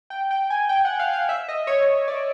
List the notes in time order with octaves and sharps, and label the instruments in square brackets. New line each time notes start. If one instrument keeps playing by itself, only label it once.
[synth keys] G5
G5
G#5
G5
F#5
F5
F5
E5
D#5
C#5
D5